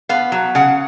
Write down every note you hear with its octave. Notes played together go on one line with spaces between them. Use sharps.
B3 F5
F#3
C#3 F#5